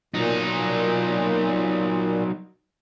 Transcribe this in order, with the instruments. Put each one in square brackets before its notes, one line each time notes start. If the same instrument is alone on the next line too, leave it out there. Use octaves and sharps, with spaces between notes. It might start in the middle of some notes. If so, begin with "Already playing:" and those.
[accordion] A#2 [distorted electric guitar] F#3 D#4